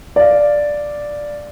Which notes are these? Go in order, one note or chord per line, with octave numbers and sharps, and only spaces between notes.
D5 F5